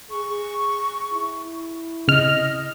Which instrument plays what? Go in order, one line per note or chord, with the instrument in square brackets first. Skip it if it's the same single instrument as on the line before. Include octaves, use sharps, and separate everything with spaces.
[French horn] G#4 [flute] C#6
[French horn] E4
[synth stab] C#3 F6 [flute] D#5